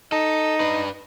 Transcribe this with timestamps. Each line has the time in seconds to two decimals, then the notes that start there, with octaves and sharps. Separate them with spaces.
0.12 D#4 A4
0.60 D4 B4